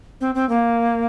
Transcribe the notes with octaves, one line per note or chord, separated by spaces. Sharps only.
C4
C4
A#3